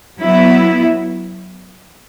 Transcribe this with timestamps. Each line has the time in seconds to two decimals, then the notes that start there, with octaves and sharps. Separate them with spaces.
0.20 F#3 B3 E4